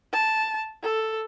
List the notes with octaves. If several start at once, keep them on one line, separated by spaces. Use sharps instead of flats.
A5
A4